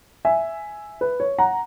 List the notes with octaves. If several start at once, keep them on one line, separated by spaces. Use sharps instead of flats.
E5 G#5
B4
C#5
F#5 A#5